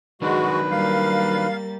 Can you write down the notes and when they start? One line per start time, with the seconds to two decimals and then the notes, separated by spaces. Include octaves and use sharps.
0.22 D#3 F#3 G#3 D4 F#4 B4
0.70 G3 A#3 F5 A6